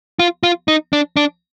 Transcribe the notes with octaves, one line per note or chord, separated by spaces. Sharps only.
F4
F4
D#4
D4
D4